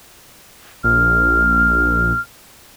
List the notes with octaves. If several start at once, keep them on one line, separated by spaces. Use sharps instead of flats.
A#1 F6